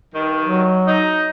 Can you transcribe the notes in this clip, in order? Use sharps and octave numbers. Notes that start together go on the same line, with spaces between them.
G2 D#3
F#3
D#4